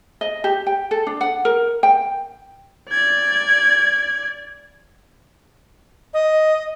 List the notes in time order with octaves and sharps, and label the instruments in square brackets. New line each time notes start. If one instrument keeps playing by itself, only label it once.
[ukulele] D#5
G4
G5
A4
D4
F#5
A#4
G5
[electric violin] D5 G#6
[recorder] D#5